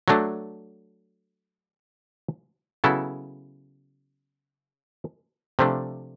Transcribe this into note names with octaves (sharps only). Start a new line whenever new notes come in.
F#3 A3 D4
C#3 F#3 B3 E4 A4
C3 F3 A3 D4